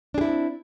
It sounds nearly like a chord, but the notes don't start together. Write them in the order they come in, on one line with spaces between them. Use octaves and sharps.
D4 G#4 E4 C4